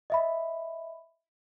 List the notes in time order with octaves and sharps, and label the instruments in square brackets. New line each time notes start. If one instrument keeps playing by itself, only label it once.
[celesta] D#5 E5 B5